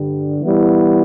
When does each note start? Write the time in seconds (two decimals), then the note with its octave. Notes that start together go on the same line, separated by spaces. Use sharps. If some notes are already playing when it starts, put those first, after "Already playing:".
Already playing: G2 D3 G3
0.41 E3 G3 B3 E4